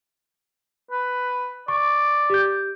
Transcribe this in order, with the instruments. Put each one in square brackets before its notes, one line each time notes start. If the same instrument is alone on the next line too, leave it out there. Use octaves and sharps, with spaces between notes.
[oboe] B4
[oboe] D5 [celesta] C#6
[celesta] G4 G6